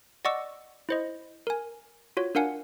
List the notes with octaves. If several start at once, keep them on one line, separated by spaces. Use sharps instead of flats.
D5 D#5 F#5 C#6 D6 E6
E4 C5 D#5
A#4 G#5
F4 F#4 C#5
D4 A#4 F5 F#5 G#5